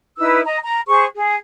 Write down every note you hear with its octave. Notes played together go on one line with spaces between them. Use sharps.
D#4 E4 B4 E6
D#5 A#5
A#5
G#4 C5 C#6
G#4